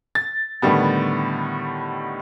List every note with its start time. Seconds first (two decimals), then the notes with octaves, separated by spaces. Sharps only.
0.15 A6
0.62 A2 D3 D#3 G3 B3